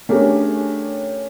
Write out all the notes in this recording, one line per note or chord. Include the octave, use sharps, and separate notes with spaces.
A3 C#4 D4 G4 G#4 A#4